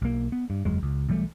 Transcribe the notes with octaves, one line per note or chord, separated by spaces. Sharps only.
B1 A#3
B3
G2
F#1 E2 F#3 G#3
C#2
B1 E3 G3 A3